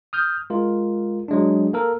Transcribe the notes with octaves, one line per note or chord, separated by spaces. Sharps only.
D#6 F6 G6
G#3 F4 A#4
F#3 G#3 D4
A#3 A4 A#4